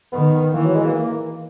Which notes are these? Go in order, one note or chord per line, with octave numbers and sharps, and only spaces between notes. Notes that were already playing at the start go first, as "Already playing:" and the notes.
D#3 B3
E3 A#3
F#3
G#3
A#3
A#3